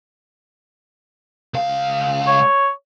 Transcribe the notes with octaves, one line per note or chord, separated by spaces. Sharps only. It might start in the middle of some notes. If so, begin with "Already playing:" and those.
C#2 F5
C#5